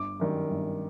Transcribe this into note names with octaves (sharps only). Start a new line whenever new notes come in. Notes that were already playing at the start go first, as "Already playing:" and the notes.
Already playing: G1 D6
F#2 D#3 G3
G1